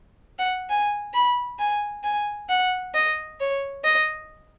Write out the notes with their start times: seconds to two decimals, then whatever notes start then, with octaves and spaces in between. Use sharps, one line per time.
0.39 F#5
0.70 G#5
1.14 B5
1.59 G#5
2.04 G#5
2.49 F#5
2.95 D#5
3.40 C#5
3.84 D#5